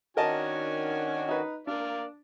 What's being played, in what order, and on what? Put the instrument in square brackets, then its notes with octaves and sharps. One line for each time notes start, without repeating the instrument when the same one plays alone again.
[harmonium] D#3 F#4 [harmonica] C#4 D4 G#5 [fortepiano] A#4 D#5 A5
[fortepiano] D#4 B4
[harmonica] A#3 D5 F5 [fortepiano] D4